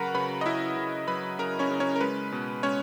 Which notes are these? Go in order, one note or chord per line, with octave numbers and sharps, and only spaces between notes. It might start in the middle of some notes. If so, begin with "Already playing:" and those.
Already playing: C#3 F#3 F#4 A#4 B4 F#5 A#5 B5
C#3 B4 B5
D#5
C#3 E4 E5
C#3
F#3 B4 B5
C#3 A#4 A#5
C#4 C#5
C#3
C#4 C#5
A#4
G#3 B4
B2
G#3 C#4 C#5